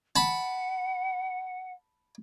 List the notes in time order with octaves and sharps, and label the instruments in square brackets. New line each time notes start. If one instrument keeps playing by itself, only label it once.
[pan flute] F#5 [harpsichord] A5 B5